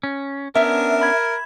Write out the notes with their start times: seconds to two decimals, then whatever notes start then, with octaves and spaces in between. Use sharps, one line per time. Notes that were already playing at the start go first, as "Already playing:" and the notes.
0.03 C#4
0.55 B3 C#4 D4 A#4 E5
1.01 B5 G#6